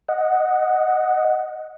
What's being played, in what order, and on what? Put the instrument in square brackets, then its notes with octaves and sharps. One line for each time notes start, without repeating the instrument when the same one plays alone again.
[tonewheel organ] D#5 F#5